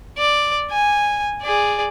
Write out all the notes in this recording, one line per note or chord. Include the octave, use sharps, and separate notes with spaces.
D5
G#5
G#4 D5